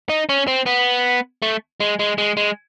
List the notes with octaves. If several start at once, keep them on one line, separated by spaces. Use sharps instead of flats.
D#4
C#4
C4
B3
A3
G#3
G#3
G#3
G#3